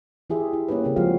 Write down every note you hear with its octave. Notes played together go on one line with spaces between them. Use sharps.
E3 E4 G4 G#4 E5
E4
G3 A#3 C#4 D#4 G4 B4
C#3 C4 C#4
F3 G3 G#3 C4 F#4 F5